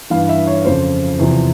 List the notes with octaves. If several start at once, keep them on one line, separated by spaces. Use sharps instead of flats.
G2 E3 F5
E5
C#5
F2 C#3 F3 C5
E2 C3 F3